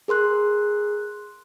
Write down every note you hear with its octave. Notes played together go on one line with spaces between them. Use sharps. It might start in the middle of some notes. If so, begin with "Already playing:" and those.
G#4 A#4 C6 F#6